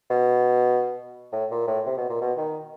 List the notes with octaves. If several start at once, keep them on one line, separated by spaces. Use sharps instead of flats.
B2
A2
A#2
A2
C3
B2
A#2
B2
D#3